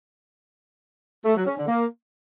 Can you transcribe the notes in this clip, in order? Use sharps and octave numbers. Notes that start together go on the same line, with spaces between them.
A3
F#3
C#4
D3
A#3